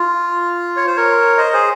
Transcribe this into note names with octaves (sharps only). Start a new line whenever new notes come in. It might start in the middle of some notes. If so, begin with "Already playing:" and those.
Already playing: F4
C#5
C5
A#4 C#5
C5 D#5
G#4 C5